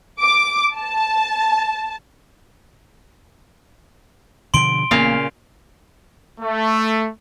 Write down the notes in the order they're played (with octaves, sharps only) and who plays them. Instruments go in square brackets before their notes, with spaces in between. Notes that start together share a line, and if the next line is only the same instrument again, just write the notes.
[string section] D6
A5
[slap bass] B2 D3 F3 [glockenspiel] C6 D7 G7
[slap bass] A1 A#3 B3 [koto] A#2 C#3 F5
[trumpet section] A3